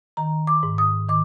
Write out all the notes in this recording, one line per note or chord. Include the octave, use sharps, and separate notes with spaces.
D#3 A#5
D6
G#2
D#6
D#3 D6